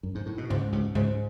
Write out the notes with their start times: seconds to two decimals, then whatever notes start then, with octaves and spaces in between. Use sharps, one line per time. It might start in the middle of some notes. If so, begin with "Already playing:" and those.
0.03 F#2
0.15 G#2
0.26 A2
0.38 B2
0.49 C#2 G#2 C#3
0.72 C#2 C#3
0.95 C#2 G#2 C#3